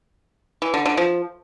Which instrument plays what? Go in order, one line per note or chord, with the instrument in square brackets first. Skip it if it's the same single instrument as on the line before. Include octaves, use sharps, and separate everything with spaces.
[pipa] E3
D3
D3
F3